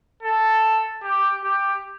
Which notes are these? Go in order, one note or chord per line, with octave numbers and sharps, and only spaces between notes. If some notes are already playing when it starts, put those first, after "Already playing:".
A4
G4
G4